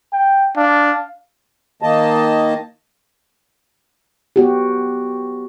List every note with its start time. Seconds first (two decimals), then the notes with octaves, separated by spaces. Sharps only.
0.13 G5
0.57 D4 F5
1.82 D#3 A#3 D#5 A5
4.36 B3 F#4 G4